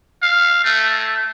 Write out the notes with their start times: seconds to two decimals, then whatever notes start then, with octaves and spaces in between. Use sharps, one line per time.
0.23 F5
0.64 A3